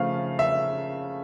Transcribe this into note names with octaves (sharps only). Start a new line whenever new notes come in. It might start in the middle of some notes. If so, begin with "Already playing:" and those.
Already playing: C#3 F3 A3 F5
E5